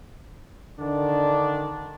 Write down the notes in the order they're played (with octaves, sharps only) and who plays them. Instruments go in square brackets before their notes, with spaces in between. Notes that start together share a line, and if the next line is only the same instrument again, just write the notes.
[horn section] D3 D#3 D4